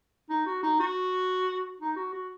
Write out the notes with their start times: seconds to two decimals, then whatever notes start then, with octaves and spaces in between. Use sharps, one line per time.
0.30 D#4
0.46 F#4
0.63 D#4
0.80 F#4
1.80 D#4
1.96 F#4
2.13 F#4